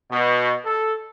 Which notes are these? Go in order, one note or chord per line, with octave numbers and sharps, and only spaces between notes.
B2
A4